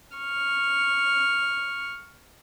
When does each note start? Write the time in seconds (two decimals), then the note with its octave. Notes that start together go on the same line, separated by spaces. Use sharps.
0.16 C#6 F6